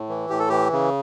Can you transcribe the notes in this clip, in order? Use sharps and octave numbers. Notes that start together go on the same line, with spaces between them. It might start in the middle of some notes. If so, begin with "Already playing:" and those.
Already playing: A2
E3
A2 G4
A4
E3 G4
C#3